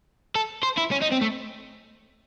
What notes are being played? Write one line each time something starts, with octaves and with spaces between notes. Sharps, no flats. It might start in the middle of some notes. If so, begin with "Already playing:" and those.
A4
C5
E4
C#4
D#4
C4
A3